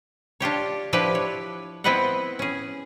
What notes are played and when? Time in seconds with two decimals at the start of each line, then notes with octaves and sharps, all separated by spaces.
0.40 D4 F4 G4 C#5
0.93 F3 D4 E4 G4 B4
1.15 C#5
1.84 B3 C4 E4 B4 D#5 F#5
2.39 C#4 G#4